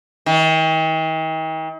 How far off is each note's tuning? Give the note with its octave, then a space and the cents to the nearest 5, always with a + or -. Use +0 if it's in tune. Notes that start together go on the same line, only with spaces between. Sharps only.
D#3 +45